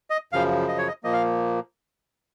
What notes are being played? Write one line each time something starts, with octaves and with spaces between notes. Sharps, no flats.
D#5
F#2 C#3 F3 F5
D#5
C#5
D#5
A#2 F3 A#3 D#5
F5